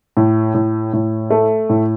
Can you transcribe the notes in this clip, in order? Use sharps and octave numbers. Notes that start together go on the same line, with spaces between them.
A2
A2
A2
A3
A2